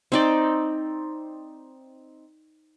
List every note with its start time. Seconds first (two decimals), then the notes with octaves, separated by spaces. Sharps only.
0.12 C4 D#4 D5